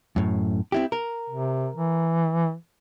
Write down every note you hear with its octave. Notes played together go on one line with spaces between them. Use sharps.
F#2 A2
C4 E4 G4
A#4
C3
E3